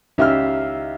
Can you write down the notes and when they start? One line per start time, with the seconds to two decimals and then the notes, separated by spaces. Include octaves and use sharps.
0.18 C#2 D#4 G4 E5 F5 F6